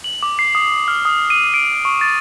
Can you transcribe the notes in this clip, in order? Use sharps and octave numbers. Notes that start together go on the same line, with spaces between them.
F#7
D6
C7
D#6
F6
D#6
D#7
D7
C#6
A6